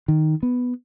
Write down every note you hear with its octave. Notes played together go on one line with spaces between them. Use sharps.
D#3
B3